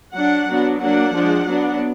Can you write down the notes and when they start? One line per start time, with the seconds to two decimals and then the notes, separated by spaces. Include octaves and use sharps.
0.14 F#3 D4 F#5
0.48 F#3 B3 D4
0.80 F#3 A#3 D4 F#5
1.13 F3 G#3 D4
1.47 F#3 B3 D4